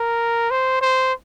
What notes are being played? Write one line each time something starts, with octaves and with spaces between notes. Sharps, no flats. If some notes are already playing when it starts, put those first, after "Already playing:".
Already playing: A#4
C5
C5